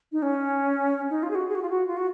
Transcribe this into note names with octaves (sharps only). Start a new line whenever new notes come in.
D#4
C#4
D#4
F4
G#4
F#4
G#4
F#4
F4
F#4
F4
F#4